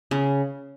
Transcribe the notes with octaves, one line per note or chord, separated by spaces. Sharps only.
C#3